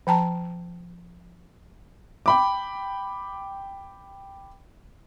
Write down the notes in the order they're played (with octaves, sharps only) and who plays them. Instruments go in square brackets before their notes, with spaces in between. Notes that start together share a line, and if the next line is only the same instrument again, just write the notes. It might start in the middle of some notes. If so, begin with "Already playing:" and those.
[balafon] F3 G5 A5 A#5
[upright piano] G5 B5 D6